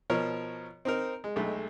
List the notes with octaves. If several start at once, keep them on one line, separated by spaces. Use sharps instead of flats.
B2 F3 A#4 C#5
C4 D#4 A#4
G#3
B1 G#3 A3